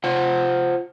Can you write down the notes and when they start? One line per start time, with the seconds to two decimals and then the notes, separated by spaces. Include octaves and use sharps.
0.04 F4 C5 F#5